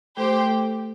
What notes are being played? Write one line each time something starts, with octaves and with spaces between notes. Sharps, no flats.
A3 G4 A4 C5 G5
A3 A4
A3 A4